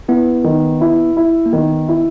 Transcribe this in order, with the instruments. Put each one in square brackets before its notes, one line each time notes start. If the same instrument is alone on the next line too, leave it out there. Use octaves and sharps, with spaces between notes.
[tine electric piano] B3 [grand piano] E4
[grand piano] D#3
E4
E4
[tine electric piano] A#3
[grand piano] D#3 [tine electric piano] B3
[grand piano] E4